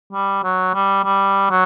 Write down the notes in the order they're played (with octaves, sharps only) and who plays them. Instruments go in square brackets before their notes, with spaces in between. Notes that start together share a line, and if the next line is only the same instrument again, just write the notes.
[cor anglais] G3
F#3
G3
G3
F#3